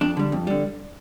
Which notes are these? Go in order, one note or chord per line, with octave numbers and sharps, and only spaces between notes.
F2 D4
D3 G3
F2
D3 G3